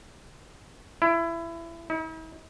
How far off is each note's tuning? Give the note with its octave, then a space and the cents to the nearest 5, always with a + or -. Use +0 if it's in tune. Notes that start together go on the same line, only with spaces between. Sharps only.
E4 +25
E4 -45